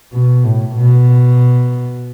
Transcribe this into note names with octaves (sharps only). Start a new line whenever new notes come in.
B2
A2
B2